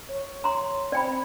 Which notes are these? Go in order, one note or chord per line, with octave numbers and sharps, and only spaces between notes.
C#5
A#5 C6
C4 D5 G5 B5